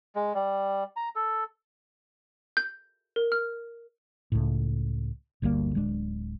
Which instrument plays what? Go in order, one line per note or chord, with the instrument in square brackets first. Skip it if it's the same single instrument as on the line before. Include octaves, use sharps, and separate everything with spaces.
[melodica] G#3
G3
A#5
A4
[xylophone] G6
A#4
F6
[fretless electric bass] C#2 A2
G1 D2 G3 A#3
D1 G#3 A3 D4